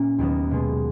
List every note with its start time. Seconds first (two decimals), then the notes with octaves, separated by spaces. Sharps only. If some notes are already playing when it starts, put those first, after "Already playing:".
Already playing: A#2 A#3 C#4
0.18 D#2 D#3 F#3 B3 F#4
0.51 B2 G#3 B3